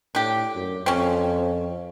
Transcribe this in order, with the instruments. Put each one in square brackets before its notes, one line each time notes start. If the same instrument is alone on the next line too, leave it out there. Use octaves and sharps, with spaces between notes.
[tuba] A2 [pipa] D4 G4
[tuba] F#2
[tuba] F2 [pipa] C4 C#4